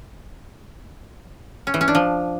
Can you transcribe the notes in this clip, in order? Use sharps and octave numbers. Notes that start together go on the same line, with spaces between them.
C#4
E3
C#4
D4
F3